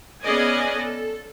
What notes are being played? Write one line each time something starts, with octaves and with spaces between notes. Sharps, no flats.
B3 C#4 G#4 D5 D#5 G#5
A4